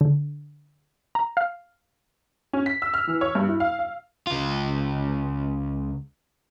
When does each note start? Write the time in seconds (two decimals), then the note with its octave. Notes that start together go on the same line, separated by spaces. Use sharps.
0.01 D3
1.15 A#5
1.37 F5
2.53 C#4
2.66 B6
2.82 E6
2.94 F6
3.07 E3
3.21 C#5
3.35 G2
3.48 E4
3.60 F5
3.79 F5
4.27 C#2 F4